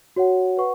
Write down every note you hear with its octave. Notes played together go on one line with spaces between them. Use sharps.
F#4 C#5 F#5
B4 F#5 C#6